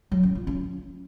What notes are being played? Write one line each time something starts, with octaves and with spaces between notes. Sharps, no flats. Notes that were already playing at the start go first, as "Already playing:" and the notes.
F#3
C#4
F4
C#4